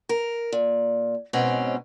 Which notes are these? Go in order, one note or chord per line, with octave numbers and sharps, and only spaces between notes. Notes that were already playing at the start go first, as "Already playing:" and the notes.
A#4
A#2
G#2 B2 C4 C#4